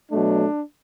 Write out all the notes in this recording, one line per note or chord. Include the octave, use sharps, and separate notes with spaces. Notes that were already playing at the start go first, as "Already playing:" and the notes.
B2 F#3 A3 D4